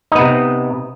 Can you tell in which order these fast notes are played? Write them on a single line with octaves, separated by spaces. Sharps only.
D#4 B3 C3